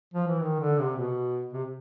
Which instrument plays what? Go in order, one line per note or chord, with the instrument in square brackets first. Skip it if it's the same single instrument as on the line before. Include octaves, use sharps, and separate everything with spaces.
[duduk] F3
E3
D#3
D3
C3
B2
C3